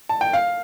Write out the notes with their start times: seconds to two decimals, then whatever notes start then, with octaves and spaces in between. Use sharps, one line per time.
0.09 A5
0.21 G5
0.33 F5